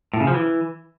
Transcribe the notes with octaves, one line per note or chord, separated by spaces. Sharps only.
A2
C#3
F3
E3